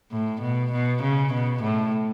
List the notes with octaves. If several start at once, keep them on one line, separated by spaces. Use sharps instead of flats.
A2
B2
B2
C#3
B2
A2